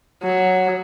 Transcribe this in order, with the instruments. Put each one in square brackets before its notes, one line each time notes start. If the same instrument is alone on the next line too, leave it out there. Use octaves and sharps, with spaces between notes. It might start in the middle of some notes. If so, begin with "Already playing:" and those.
[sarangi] F#3